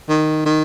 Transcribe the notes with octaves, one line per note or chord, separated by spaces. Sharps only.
D#3
D#3